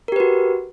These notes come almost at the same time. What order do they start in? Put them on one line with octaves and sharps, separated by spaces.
A#4 G4 B4 F#4